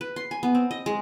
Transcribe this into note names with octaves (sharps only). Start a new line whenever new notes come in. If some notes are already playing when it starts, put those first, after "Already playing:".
B4
C6
G#5
B3
C4
D#5
G#3